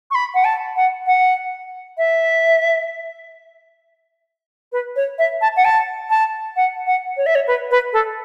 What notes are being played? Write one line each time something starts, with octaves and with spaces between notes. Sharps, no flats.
C#6
B5
F#5
A5
F#5
F#5
E5
B4
C#5
E5
A5
F#5
A5
A5
F#5
F#5
C#5
E5
C#5
B4
B4
A4